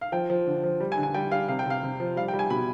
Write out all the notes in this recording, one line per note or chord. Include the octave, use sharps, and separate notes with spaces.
F5
F3 G5
F3
D3
F3
G3
G#5
D3
G#5
G3 G5
G3 F5
C3 F5
G5
C3 F5
C3
F3
G3 F5
G5
G3
G#5
B2 B5